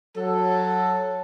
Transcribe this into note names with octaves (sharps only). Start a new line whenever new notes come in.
F#3 A4